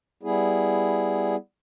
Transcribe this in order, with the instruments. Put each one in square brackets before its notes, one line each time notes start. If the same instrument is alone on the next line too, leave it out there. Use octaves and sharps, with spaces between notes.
[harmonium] G3 B3 E4 G#4